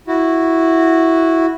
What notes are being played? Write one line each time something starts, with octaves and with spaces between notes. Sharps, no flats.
E4 F#4